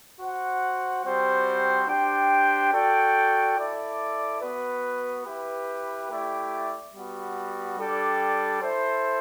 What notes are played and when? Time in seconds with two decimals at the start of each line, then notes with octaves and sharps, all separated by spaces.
0.20 F#4 C5 F#5
1.04 G3 C4 F#4 C5
1.88 D4 G4 C5 G5
2.72 F#4 A4 D5 G5
3.57 E4 A4 D5
4.41 B3 F#4 B4
5.25 E4 G4 B4
6.10 A3 E4 G4 D5
6.93 G3 B3 F#4
7.77 G3 D4 A4 D5 G5
8.61 E4 A4 C5